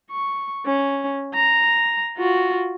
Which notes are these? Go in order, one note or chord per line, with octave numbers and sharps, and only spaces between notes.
C#6
C#4
A#5
F4 F#4